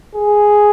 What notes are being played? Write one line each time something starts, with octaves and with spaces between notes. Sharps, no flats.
G#4